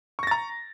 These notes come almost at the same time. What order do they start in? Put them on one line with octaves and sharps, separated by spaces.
C#6 A#6 A6 A#5